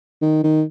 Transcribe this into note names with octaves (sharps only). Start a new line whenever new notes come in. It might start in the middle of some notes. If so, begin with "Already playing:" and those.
D#3
D#3